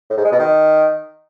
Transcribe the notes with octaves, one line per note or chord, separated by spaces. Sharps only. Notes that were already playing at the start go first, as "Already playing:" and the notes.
A2
G#2
G#3
B2
D#3